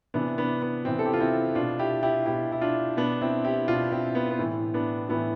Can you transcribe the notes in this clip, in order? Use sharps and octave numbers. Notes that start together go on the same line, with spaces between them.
C3 E3 B3 D4
B3 D4
B3
C3 E3 C4
A4
G4
F4
C4 E4
B2 D4 F4
E4 G4
E4 G4
B2 E4 G4
E4
D4 F4
B2 B3 D4
C4 E4
E4 G4
B2 D4 F4
C4 E4
B3
B3
A2 E3
B3 D4
A2 E3 B3